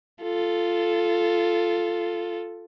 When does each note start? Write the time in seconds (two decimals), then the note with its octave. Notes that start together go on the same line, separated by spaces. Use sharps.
0.23 F4 A4